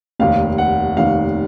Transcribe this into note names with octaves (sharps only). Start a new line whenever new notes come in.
F1 D#2 D#3 F5
F#5
F1 D#2 D#3 F5